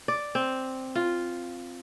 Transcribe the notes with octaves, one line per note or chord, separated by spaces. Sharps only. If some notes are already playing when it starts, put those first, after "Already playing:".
D5
C4
F4